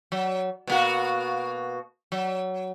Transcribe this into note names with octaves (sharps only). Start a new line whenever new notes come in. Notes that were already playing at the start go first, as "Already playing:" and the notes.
F#3
B2 A#3 F#4
F#3